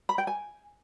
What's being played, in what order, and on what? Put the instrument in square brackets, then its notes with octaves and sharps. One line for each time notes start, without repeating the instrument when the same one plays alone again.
[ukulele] B5
G5
G#5